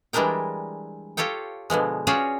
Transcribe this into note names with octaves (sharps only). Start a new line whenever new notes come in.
E3 G3 G#3 D4 A#4 G5
F4 G4 A4 C#5 G5
B2 D3 F3 G#3
C#4 F4 F#4 G#4 C#5 D5